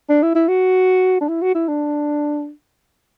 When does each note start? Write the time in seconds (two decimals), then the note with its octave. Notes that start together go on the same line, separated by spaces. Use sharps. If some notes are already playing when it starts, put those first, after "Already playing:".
0.09 D4
0.23 E4
0.35 E4
0.48 F#4
1.21 D4
1.28 E4
1.42 F#4
1.55 E4
1.68 D4